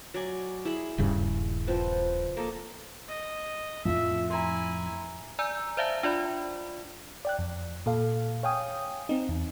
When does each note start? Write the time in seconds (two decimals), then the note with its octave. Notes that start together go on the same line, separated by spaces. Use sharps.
0.14 F#3 D5 G#5
0.65 E4 G#4 B5
0.98 D#1 G2 C#3
1.67 F3 C4 B4
2.37 A#3 A4 D#5
3.08 D#5
3.85 F2 A2 F3 E5
4.30 E4 G#5 A#5 C6
5.39 D5 G#5 A#5 E6 G6
5.77 C5 D5 E5 F5 A5
6.03 D4 F4 D5 B5
7.25 D5 G5 F#6
7.39 F2
7.86 A#2 A4 F5
8.43 C#5 F5 G5 G#5 D#6
9.09 C4 D#4
9.29 E2